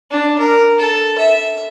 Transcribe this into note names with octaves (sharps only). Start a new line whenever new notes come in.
D4
A#4
A4
E5